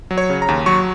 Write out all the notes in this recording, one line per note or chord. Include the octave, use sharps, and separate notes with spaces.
F#3
C#5
C#3
A#5
D#2
F#3 C#6